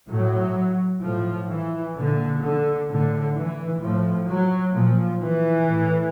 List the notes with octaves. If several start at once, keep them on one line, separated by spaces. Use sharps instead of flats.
A2 F#3
A2 F3
E3
A#2 D3
D3
A2 D3
E3
A2 F3
F#3
A#2 F3
E3
A2